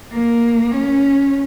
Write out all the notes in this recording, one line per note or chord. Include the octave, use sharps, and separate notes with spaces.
A#3
C#4